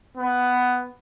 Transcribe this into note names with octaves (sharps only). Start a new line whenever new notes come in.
B3